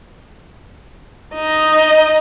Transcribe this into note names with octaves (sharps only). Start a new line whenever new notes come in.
D#4 D#5